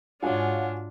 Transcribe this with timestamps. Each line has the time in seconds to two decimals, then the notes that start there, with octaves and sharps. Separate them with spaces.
0.23 G#2 D4 F4 F#4 C#5 F5 F#5 G#5